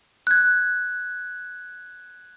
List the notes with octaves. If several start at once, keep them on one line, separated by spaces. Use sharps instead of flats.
F#6 G#6